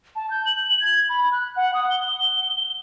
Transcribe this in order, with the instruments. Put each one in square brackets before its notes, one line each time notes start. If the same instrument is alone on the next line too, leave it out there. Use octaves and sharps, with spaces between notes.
[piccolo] A5
G6
F#7
G#6
B5
F#6
F#5
D#6
G7